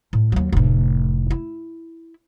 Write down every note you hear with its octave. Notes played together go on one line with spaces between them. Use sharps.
A2
D#2 F#3
F1 A2
E4